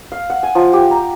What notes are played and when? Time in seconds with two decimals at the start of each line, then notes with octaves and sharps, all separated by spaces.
0.12 F5
0.30 F#5
0.43 G#5
0.55 F3
0.73 G4
0.91 A#5